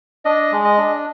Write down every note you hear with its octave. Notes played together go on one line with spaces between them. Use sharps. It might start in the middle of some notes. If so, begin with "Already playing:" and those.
D4 D#5
G#3
D#5
D4